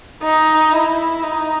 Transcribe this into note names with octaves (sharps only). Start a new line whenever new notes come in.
D#4
E4
D#4